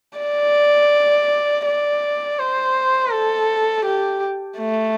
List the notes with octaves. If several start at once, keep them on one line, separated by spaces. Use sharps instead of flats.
D5
D5
C5
A4
G4
A3